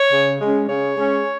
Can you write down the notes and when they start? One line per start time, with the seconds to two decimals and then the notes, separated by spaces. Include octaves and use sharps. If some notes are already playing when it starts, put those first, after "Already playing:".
Already playing: C#5
0.12 C#3
0.40 G#3 C#4
0.68 C#3 C#5
0.97 G#3 C#4